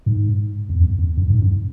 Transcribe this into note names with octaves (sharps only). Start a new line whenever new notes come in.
G#2
E2
F#2
E2
F#2
G#2
F#2